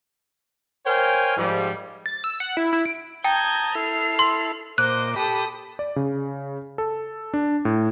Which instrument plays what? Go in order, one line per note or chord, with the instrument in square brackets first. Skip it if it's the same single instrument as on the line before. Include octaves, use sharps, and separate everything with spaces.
[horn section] A#4 C5 C#5 F5 G5 G#5
G#2 F3 G3
[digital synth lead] A6
E6
F#5
E4
E4
D7
[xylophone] G5 [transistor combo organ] A5 A#5 D#6 [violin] G6 G#6
[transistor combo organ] E4 A4 [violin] F6 C7
[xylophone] C6
[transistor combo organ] A#2 D6 [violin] C5 D#5 [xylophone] F#6
[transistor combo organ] G4 B5 [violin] A4 D#6
[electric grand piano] D5
C#3
A4
D4
A2